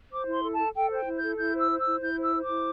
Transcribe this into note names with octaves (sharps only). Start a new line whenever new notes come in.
C5 D6
E4
C6
A4
A4 A5
A4 G5
C5 G5
E4
G6
A4
E4 G6
C5
E6
C5
E6
E4
E4 G6
C5
E6
C5
D6
E4